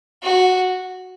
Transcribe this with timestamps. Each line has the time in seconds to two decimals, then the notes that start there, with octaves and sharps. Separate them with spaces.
0.23 F#4